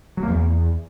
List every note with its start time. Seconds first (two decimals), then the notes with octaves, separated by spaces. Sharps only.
0.17 F#3
0.22 A#3
0.27 E2